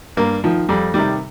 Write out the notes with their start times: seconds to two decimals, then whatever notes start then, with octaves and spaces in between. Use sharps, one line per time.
0.17 G2 A#3
0.44 D#3 F3
0.69 F2 G3
0.94 C3 D#3 G3